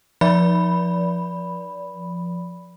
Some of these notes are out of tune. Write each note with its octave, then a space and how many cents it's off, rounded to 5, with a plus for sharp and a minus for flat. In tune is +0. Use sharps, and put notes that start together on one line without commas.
F3 +0 D5 -25 B5 +0